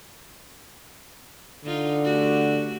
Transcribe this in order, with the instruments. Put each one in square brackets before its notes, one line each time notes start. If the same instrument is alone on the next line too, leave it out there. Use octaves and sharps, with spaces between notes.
[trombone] D3 [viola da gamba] D#4 F4
[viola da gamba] A3 F#4 G4